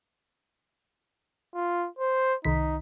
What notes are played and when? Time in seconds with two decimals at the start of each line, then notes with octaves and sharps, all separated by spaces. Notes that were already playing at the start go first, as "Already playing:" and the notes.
1.54 F4
1.99 C5
2.45 C2 D#3 D#4 B6